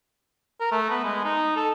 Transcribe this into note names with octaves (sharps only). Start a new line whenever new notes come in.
A#4
A3
B3
G#3
D#4
A4